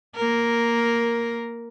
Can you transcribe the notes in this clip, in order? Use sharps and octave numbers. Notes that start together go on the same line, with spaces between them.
A#3 A#4